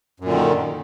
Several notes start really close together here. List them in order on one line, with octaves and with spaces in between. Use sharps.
F#2 A#2 D3 D#3